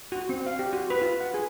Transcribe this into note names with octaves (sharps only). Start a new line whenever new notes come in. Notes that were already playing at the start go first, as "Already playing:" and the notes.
F#4
C4
F5
G4
F#4
B4
F4
F#5
G#4